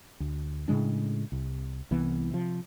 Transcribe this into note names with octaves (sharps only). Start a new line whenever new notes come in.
D2
A2 C#3 G#3 D4
C2
C2 E3 B3
C3 F3